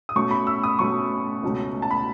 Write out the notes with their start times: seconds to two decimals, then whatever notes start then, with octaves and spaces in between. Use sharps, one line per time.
0.09 D#6
0.16 B2 A3 C#4 C#6
0.31 B5
0.47 E6
0.64 D#6
0.79 B2 A3 C#4 C#6
1.43 C#2 B2 A3 C#4
1.82 A5
1.91 B5